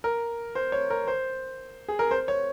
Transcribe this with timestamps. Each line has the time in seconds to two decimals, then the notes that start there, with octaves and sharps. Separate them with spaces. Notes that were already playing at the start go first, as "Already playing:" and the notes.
0.04 A#4
0.55 C5
0.72 C#5
0.90 A#4
1.08 C5
1.88 G#4
1.99 A#4
2.11 C5
2.28 C#5